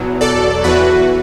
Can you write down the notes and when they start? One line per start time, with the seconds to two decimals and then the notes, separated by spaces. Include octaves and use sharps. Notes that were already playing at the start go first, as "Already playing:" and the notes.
Already playing: E2 B2 F#3
0.21 A4 D5
0.64 E2 E3 F#4 B4